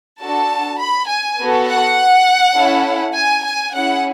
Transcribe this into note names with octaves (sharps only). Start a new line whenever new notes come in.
D4 F#4 A4 A5
B5
G#5
B3 F#4 A4
F#5
C#4 E4 A4
G#5
G#5
C#4 E4 G#4 F#5